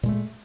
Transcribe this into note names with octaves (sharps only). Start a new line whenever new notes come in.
A#2 G#3 A3